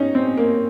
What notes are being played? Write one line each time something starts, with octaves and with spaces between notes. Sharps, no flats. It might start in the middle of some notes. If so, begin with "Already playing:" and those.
Already playing: C#4 D#4
C4
A#3